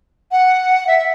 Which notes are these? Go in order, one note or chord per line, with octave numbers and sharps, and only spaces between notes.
F#5
E5